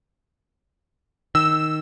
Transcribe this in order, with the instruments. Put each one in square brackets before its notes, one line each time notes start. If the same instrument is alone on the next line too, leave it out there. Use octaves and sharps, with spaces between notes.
[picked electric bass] D#3 [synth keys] E6